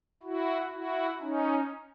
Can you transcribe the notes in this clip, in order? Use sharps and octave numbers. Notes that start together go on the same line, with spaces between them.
E4 F#4
E4 F#4
C#4 D#4